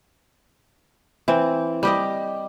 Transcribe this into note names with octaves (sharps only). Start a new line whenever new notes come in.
E3 C4
G3 G4 D#5